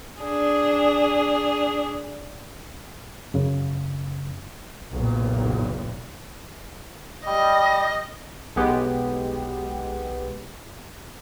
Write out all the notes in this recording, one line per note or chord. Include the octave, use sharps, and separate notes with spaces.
D4 G#4
F#2 C#3
F#1 B1 A#2
G3 D#5
B1 G#3 B3 G4